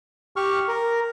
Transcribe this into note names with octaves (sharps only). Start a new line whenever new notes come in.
G4 C#6 F6
A#4